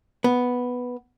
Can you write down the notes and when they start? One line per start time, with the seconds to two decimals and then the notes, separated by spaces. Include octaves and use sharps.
0.24 B3